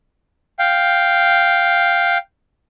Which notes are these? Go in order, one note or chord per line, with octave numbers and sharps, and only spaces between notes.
F5 G5